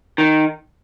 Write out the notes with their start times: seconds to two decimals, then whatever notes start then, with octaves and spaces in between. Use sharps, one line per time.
0.18 D#3